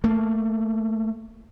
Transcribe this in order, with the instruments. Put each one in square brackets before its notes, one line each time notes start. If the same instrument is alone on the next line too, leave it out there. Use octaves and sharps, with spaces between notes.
[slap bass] A3 A#3